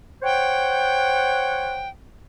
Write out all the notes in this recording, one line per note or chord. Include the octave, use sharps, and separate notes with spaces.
C5 C#5 F#5 G5